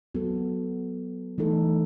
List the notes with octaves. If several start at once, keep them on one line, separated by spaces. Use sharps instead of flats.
F#3 B3 F#4 A4
E3 A3 D#4 A4